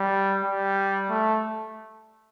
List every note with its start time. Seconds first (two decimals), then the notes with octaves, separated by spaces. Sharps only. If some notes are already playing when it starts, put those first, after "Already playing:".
Already playing: G3
0.44 G3
1.10 A3